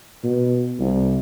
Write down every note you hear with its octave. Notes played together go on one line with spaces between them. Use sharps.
B2
C2